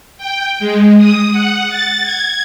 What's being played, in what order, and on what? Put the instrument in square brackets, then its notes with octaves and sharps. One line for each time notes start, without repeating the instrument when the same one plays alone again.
[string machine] G5
G#3
D#6
F#5
A6
G#6